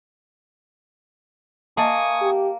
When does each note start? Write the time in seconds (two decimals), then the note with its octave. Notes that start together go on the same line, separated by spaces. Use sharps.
1.77 A#3 D#5 E5 G#5 A5 C#6 D#6
2.21 G4